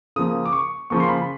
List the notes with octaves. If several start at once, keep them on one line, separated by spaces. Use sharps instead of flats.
C#3 F3 A#3 D#6
D6
C#6
C#3 F3 A#3 C#6
C6
B5